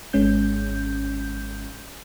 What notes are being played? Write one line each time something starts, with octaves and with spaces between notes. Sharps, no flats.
G#1 G#3 C#4 G6